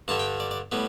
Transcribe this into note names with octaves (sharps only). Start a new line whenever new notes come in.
G2 D3 G3 A5
G5
D5
D5
A2 G3 B3